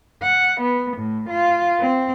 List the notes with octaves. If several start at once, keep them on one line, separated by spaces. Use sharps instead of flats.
F#5
B3
A2
F4
C4